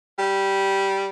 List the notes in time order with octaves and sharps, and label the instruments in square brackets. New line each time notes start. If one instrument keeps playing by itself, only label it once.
[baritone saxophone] G3